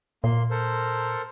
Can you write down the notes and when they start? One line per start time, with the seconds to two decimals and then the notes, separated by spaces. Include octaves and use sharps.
0.24 A#2 A#3 C6
0.50 A4 A#4 C5